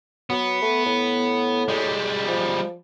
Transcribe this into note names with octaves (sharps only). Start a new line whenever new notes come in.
F#3 B3
A3
A2
G3 G#3
F3